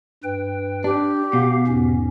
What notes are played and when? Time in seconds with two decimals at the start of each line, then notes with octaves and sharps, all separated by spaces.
0.24 G2 B4 G5
0.84 D4 G4
1.33 B2 B3 F5
1.67 E2 G#2 C#4